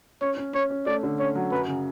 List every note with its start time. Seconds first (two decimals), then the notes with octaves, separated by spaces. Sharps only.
0.21 C#4 C#5
0.37 C#4
0.53 C#4 C#5
0.70 C#4
0.86 A3 D5
1.03 D3
1.19 C#4 C#5
1.35 F#3
1.51 F#2 B4
1.68 C#3